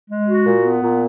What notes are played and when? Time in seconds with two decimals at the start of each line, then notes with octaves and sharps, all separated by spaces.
0.11 G#3
0.28 F#4
0.46 A#2
0.65 B3
0.83 A#2